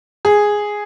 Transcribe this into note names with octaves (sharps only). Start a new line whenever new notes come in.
G#4